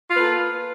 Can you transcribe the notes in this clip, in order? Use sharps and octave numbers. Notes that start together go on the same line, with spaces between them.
A#3 F4 A4 B4